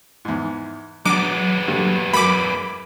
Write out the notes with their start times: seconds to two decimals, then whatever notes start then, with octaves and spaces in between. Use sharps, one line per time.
0.25 E2 G#2
1.05 F#3 G#3 B3 D4 A#5 D6
1.68 G2 A#2 D3
2.14 F#2 B5 D6